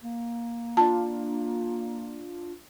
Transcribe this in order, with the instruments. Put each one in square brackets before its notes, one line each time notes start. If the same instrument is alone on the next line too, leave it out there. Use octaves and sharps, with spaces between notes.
[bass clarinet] A#3
[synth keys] D4 F4 [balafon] A5